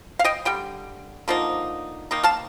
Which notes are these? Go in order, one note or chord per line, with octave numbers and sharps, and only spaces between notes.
F5
D#5 G5
D3 G3 G5
D3 F3 A#3 D#4
D#3 A#3 D#4
F5 A5